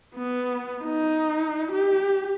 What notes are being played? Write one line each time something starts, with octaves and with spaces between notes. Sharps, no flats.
B3
D#4
G4